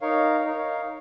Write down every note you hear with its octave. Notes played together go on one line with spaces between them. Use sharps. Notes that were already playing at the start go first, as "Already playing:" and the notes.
D#4 A#4 C#5 F5
D#4 A#4 C#5 F5